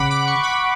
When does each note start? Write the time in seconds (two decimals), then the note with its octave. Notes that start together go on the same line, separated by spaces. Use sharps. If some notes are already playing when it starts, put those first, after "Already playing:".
Already playing: C#3 F#5 B5 D6
0.11 D6
0.27 C#6
0.43 B5